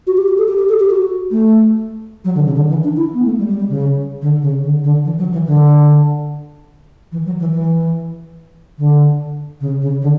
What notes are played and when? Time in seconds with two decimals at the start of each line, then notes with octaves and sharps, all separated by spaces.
0.07 F#4
0.17 G4
0.28 G4
0.38 A4
0.48 G4
0.58 G4
0.69 A4
0.80 G4
0.90 F#4
1.31 A3
2.24 F#3
2.35 D3
2.45 C#3
2.56 D3
2.69 E3
2.84 D4
2.96 E4
3.14 B3
3.25 A3
3.38 G3
3.49 G3
3.59 G3
3.69 C#3
4.22 D3
4.42 C#3
4.63 D3
4.84 D3
5.05 E3
5.18 F#3
5.32 E3
5.46 D3
7.12 E3
7.25 F#3
7.40 E3
7.53 E3
8.78 D3
9.60 C#3
9.81 C#3
10.02 D3